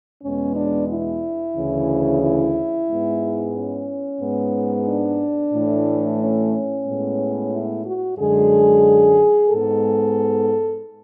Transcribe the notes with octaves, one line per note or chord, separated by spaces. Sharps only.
E2 B2 G#3 B3 C#4
D4
E4
D2 C#3 E3
E4
G#2 G#3 B3
C#4
G#2 G#3 B3
D4
A2 E3 A3
C#4
A2 G#3 B3
E4
F#4
F#2 D3 G#3 G#4
G#2 G#3 B3 A4